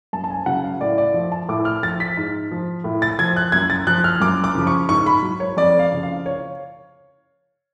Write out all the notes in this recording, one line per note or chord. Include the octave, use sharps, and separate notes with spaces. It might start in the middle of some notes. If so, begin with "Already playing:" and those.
F#2 A5
A5
G#5
C#3 F#3 F#5
F5
A2 D5
D5
F3
A5
A2 D6
F6
F3 A6
B6
G#2
F3
A2
A6
F3 G#6
F#6
F#2 G#6
A6
F3 F#6
F6
F#2 D6
D6
C#3 F3
C#6
G#2 C#6
B5
F#3
C#5
F2 D5
F5
C#3 F3
F5
C#5